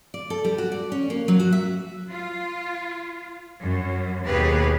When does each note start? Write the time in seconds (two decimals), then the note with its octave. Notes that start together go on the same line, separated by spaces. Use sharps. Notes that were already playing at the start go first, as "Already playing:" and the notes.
0.14 D5
0.30 A4
0.45 G3
0.58 F#4
0.72 D5
0.92 C#4
1.10 A#3
1.28 F#3
1.40 F#4
1.52 E5
2.10 F4
3.61 F#2
4.25 D#2 B2 G4 G#4 B4